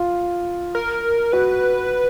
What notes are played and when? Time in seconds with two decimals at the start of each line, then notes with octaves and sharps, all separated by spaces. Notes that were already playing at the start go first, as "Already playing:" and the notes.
Already playing: F4
0.75 A#4
1.32 F#4 B4